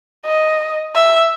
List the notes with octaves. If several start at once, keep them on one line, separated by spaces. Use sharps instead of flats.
D#5
E5